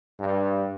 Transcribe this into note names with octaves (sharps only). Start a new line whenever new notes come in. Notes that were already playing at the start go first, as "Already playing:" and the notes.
G2